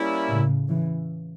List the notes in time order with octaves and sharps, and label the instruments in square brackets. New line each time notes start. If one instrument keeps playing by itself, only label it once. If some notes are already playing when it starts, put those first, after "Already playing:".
Already playing: [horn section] G3 A#3 C#4 E4
[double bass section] A2 C#3
C#3 E3